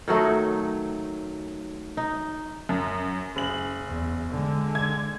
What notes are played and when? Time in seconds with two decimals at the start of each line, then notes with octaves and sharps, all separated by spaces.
0.08 D#3 F#3 A3 D#4
1.97 D#4
2.69 F#2
3.36 F#1 F#7
3.88 E2
4.30 D3 G#3
4.75 G#6